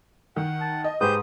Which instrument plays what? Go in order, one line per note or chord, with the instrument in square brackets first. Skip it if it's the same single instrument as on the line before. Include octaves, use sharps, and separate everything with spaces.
[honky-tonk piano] D#3 [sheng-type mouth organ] F#5
[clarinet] A5
[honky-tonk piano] D#5
[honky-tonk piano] G#2 [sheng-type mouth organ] G4 C5 G6 [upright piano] G#4 B4 [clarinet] D#6